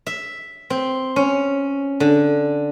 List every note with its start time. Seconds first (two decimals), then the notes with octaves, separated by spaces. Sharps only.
0.06 E5
0.70 C4
1.16 C#4
2.00 D3